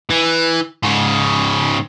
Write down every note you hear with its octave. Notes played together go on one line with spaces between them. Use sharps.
E3
G#2 C#3